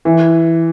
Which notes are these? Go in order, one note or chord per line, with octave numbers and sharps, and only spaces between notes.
E3